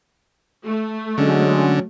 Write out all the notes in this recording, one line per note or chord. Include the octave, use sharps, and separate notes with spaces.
A3
D3 F#3 G#3 C#4